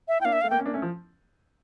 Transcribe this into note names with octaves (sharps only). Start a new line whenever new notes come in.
E5
E4 G5
A#3 D4 F5
E5
A3 F5
A#3 G5
C#4
A#3 D4
A3 C#4
F3